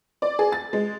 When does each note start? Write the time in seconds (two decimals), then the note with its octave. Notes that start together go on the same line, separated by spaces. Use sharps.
0.22 D5
0.39 G#4
0.52 A6
0.73 G#3